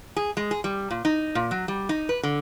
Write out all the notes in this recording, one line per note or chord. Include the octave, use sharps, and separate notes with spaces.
G#4
G#3
G#4
G3
A#2
D#4
A#2
F#3
G3
D#4
B4
D3